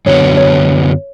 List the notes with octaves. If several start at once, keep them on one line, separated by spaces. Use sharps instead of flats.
F#2 D3 F#3 B3 C#5
C#5